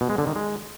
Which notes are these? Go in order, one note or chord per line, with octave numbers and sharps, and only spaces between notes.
B2
G#3
D3
D#3
G#3